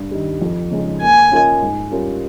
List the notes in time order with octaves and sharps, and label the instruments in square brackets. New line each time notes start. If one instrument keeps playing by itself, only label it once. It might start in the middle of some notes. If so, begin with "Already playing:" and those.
Already playing: [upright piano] G2
D#3 G3
F2
C#3 G#3 D#4
[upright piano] A#3 [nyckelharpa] G#5
[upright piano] C#4 F4 A#4 D#5
G#2
G3 C#4 F4 A#4